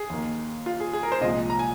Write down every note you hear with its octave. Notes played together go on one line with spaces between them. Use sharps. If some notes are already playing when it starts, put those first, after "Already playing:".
Already playing: G#4
D#2 D#3 A#3
F4
G#4
G#4
A#4
C5
C2 A#2 F3 G#3 D#5
A#5
G#5